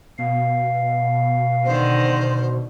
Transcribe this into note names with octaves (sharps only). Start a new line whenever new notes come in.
B2 F5
D3 D#3 C5